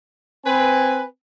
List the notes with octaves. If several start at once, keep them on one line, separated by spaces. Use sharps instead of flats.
C4 B4 G#5